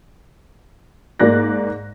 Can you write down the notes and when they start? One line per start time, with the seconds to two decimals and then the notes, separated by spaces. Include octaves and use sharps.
1.20 G#2 A#3 D5 F#6 A#6